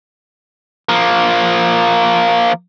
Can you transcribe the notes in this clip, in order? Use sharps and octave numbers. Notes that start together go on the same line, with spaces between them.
F3 A#3